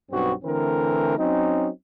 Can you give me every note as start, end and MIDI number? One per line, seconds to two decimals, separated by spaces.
0.11 0.32 35
0.11 0.32 43
0.11 0.32 59
0.11 0.32 60
0.11 0.32 66
0.44 1.16 50
0.44 1.16 52
0.44 1.16 57
0.44 1.16 60
0.44 1.16 70
1.18 1.69 54
1.18 1.69 60
1.18 1.69 61
1.18 1.69 63